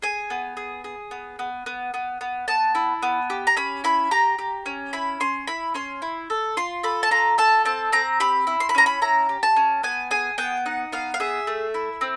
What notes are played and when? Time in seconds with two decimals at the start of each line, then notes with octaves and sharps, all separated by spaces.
0.02 G#4 G#5
0.30 B3
0.57 G#4
0.84 G#4
1.11 B3
1.39 B3
1.66 B3
1.94 B3
2.21 B3
2.48 B3 A5
2.75 E4
3.02 B3
3.30 G4
3.47 A#5
3.56 C#4 B5
3.84 E4 B5
4.11 G4 A#5
4.39 G4
4.66 C#4
4.93 E4 B5
5.20 C#4 C6
5.47 E4 B5
5.74 C#4 C6
6.02 E4
6.30 A4
6.57 F4 C6
6.83 A4 B5
7.03 A5
7.11 F4 A#5
7.38 A4 A5
7.65 C4 A5
7.92 C4 A#5
8.20 G4 B5
8.47 E4
8.60 C6
8.69 B5
8.75 C#4 A#5
8.86 B5
9.02 E4 A#5
9.29 G4
9.43 A5
9.56 C#4
9.83 B3 G#5
10.11 G#4 G#5
10.38 B3 G5
10.66 D#4 F#5
10.92 B3 F5
11.14 F5
11.20 G#4 E5
11.47 A3
11.74 E4
12.01 C4